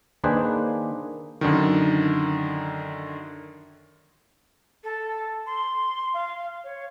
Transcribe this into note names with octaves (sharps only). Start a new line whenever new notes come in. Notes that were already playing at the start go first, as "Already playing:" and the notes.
D#3 A#3 D4 G#4 B4 C5
F#2 D3 D#3
A4
C6
F5
C#5